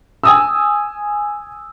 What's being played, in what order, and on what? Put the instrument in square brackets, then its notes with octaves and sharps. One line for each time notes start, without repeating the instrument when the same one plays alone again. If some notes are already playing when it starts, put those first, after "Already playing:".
[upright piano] G#5 D#6 E6